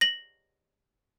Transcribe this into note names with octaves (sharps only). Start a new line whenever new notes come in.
A#6 F#7